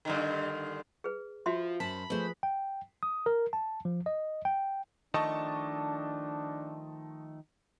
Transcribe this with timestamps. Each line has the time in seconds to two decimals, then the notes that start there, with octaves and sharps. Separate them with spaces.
0.05 G2 D3 D#3
1.04 G#4 B4
1.46 F3 F#4 E5 C6
1.80 F#2 C5 A5 B5
2.10 F3 A3 G#4 B4 C5
2.43 G5
3.03 D#6
3.26 A#4
3.53 A5
3.85 F3
4.06 D#5
4.45 G5
5.14 D#3 F3 A3 D4 D#5 A5 C#6